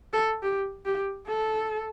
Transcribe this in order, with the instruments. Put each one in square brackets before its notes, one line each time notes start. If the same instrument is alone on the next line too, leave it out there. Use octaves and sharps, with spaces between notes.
[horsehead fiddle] A4
G4
G4
A4